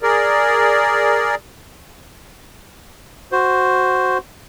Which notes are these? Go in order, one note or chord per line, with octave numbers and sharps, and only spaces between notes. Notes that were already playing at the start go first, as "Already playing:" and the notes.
G#4 A#4 D5
F#4 C5